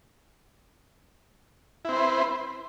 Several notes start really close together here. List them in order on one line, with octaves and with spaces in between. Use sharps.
E4 C4 C5 B4